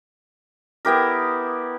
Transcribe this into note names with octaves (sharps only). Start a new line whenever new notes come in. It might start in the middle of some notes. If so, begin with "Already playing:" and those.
B3 E4 G4 A#4